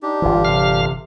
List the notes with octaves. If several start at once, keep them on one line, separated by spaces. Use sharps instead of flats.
D4 D#4 G4
G1 E3 F4
C3 F5 F6